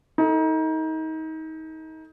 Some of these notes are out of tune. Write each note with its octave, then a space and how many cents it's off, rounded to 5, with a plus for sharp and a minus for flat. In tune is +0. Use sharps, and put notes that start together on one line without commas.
D#4 +30 A4 +20